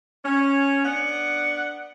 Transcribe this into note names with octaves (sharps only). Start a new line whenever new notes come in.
C#4
B3 D4 F#5